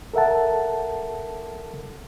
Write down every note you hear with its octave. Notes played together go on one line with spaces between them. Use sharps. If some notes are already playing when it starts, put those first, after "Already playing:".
A4 A#4 E5 F#5 A5